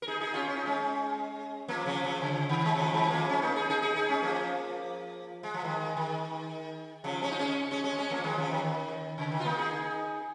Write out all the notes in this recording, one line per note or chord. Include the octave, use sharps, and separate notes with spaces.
A#4
D#4 G#4
D#4 G#4
C#4 F4
C#4
D#4
G#3 C#4
F3 A#3
C#3 F3
C#3 F3
C#3
D#3
G#3
C#3 F3
D#3 G#3
G#3
F3 A#3
G#3 C#4
A#3 D#4
D#4 G#4
D#4 G#4
D#4 G#4
D#4 G#4
G#3 C#4
F3 A#3
G#3
F3
D#3 G#3
D#3
C#3 F3
G#3 C#4
D#4
G#3 C#4
G#3 C#4
G#3 C#4
G#3 C#4
F3 A#3
D#3 G#3
C#3 F3
D#3
D#3
C#3
D#3
F4
A#3 D#4
D#4 G#4